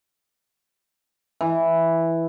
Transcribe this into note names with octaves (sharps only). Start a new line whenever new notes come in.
E3